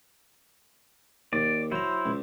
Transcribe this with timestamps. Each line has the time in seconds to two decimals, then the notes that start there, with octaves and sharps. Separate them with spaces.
1.33 D#2 D5
1.72 F#3 E4 C5 A#5
2.06 C#2